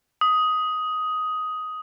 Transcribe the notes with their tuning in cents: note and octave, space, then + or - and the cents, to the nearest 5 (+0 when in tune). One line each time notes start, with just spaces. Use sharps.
D#6 +10